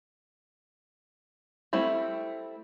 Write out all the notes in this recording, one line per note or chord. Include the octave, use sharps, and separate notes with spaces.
G3 A3 C4 E4